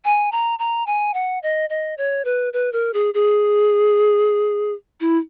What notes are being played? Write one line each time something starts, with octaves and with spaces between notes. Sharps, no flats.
G#5
A#5
A#5
G#5
F#5
D#5
D#5
C#5
B4
B4
A#4
G#4
G#4
E4